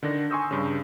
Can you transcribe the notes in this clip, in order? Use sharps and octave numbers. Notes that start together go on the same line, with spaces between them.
D3 D#3 D4 A#6
G#5 C6 C#6 D#6 E6 G6
G2 C#3